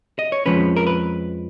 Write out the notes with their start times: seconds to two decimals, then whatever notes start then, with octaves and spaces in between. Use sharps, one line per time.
0.19 D#5
0.32 C#5
0.46 F2 F3 G#3 C#4 B4
0.76 A#4
0.87 B4